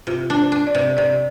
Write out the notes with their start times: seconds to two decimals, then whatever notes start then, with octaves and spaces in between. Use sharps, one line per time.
0.07 C3 F4
0.30 D4
0.37 C5
0.52 D4
0.67 D5
0.75 C3
0.97 C3 D5